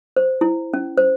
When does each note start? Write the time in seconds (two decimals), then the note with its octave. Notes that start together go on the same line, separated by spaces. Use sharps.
0.16 C5
0.41 E4
0.74 C#4
0.98 C5